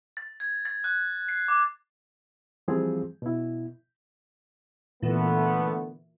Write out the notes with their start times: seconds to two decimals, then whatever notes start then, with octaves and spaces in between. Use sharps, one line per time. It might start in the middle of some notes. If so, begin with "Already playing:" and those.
0.17 A6
0.40 G#6
0.65 A6
0.84 F#6
1.29 C7
1.48 D6
2.68 E3 F3 G3 C4 F4 G#4
3.22 B2 E4
5.02 A#2 D3 E3 A3 B3